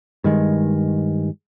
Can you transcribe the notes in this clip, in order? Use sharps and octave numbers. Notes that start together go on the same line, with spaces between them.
G2 D#3 G#3